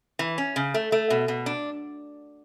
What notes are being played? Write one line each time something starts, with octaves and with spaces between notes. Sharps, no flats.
E3
C#4
C#3
A3
A3
B2
B2
D4